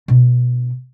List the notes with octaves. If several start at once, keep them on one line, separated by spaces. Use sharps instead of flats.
B2 D4